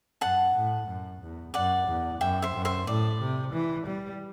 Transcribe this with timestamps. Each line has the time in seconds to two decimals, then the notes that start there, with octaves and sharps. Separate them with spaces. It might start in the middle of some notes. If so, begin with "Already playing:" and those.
0.21 F#2 F#5 A5
0.55 A2
0.87 F#2
1.22 E2
1.54 F#2 D5 F#5
1.88 E2
2.21 F#2 E5 G5
2.42 C5 E5
2.55 F#2
2.65 C5 E5
2.87 A2 D5
3.21 C3
3.53 E3
3.87 G3